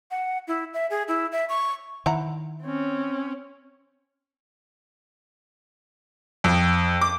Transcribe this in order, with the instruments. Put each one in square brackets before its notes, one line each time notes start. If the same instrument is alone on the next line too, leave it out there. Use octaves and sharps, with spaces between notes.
[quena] F#5
E4
E5
G#4
E4
E5
C#6
[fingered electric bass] D#3 [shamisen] E4 F#5 A#5
[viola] C4 C#4
[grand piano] F2
D6